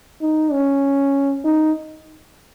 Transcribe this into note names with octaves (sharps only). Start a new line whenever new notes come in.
D#4
C#4
D#4